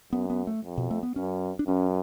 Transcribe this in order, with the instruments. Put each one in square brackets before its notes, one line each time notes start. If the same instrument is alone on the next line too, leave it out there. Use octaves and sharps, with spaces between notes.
[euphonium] F#2 [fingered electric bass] B3
[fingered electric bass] B3
A3
[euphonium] F2
[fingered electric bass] B2
A3
B3
[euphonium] F#2 [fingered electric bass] C#4
[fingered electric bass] D4
[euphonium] F#2 [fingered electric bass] C#4